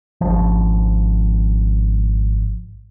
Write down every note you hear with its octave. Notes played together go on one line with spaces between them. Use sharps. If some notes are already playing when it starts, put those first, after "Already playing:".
G#1 F3